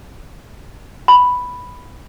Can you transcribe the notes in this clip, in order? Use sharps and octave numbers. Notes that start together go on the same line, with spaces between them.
B5